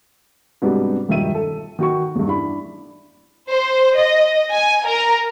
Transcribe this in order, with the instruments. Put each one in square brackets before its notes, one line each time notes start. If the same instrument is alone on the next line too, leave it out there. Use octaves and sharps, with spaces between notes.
[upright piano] G#2 C3 G3 B3 D4 F#4
E1 G2 D#3 F3 E5 D#7
A4
D#3 F#4 C#6
E2 G2
D4 E4 B5
[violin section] C5
D#5
G#5
A#4